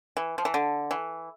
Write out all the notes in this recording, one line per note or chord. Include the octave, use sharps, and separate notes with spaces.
E3
F3
E3
D3
E3